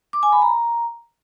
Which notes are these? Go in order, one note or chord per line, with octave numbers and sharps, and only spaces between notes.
D6
G#5
B5
A#5